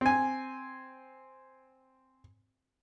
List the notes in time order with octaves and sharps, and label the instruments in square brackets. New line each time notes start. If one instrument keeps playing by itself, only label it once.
[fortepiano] C4 G#5